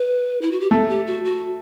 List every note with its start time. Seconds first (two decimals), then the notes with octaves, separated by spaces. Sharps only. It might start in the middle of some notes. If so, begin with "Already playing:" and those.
Already playing: B4
0.42 E4
0.51 F#4
0.61 G4
0.71 A3 A4
0.89 G4
1.07 F#4
1.25 F#4